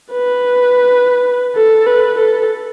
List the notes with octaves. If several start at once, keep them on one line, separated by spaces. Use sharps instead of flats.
B4
A4
B4
A4